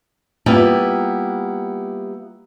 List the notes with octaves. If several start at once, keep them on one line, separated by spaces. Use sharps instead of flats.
G3 A#3 B3 E4 F4 G4